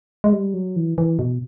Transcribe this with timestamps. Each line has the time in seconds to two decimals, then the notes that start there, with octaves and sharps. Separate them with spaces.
0.24 G#3
0.33 G3
0.54 F#3
0.76 E3
0.98 E3
1.19 B2